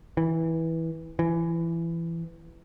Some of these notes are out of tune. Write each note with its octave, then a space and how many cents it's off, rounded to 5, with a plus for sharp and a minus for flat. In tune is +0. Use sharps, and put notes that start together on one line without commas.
E3 -15
E3 +20